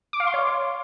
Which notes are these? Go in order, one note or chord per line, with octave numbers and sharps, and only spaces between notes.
D6
F5
C6
C#5